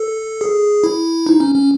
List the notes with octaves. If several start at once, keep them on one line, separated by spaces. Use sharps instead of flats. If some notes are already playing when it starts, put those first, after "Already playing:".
Already playing: A4
G#4
E4
D#4
C#4
C#4